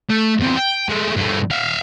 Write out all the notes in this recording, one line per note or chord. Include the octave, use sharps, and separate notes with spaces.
A3
E2 C4
G5
G#3 A3
G2 A3
E5 F5